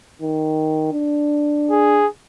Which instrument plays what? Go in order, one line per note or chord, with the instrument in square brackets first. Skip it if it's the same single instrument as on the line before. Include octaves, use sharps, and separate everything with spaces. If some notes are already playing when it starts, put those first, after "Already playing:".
[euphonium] D#3
D4
[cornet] G#4